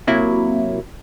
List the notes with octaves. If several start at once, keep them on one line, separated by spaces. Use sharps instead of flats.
C3 F#3 A#3 E4